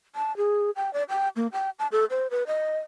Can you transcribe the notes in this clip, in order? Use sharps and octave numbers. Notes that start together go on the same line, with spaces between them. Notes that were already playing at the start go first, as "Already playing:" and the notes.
A5
G#4
G5
D5
G5
A#3
G5
A5
A4
C5
B4
D#5